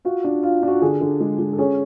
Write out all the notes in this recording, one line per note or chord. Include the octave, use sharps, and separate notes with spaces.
F4 F#4
D4
F4
D4
F#4
D3 G#4
D3
G#3
G#3
A4
C#4 G#4